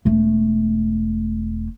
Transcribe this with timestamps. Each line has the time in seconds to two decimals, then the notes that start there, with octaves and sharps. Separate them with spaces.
0.05 E1 A3